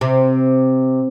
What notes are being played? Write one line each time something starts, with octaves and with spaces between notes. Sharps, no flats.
C3